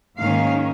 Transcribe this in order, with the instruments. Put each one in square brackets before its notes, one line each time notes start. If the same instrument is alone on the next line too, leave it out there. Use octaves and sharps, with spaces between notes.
[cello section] G#2 D#3 A#3 C#4 F5